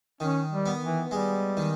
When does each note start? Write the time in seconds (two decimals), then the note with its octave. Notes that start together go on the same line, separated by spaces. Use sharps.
0.20 D#3 C#4
0.51 G3
0.66 B3
0.82 E3
1.11 G3 G#3
1.57 D#3